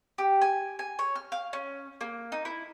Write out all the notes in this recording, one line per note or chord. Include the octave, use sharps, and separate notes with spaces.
G4
G#5
G#5
C#5
F6
F5
C#4
A#3
D#4
E4